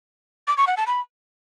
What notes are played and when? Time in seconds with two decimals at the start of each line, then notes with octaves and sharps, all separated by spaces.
0.47 D6
0.57 C#6
0.67 F#5
0.77 A5
0.87 B5